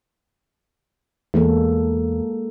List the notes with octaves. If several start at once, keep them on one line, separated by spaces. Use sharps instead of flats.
E2 G#3 A#3 A4